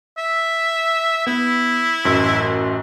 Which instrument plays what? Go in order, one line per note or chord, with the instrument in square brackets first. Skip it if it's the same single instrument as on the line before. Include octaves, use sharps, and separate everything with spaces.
[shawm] E5
[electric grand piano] B3 [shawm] E4
[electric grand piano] A1 F#2 E6